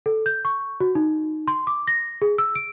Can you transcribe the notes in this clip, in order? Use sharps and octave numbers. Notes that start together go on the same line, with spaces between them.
A4
G6
C#6
F#4
D#4
C6
D6
A#6
G#4
E6
D7